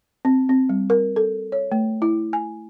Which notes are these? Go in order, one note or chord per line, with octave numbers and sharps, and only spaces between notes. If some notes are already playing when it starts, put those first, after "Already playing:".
C4
C4
G3
A#4
A4
C#5
A3
E4
G#5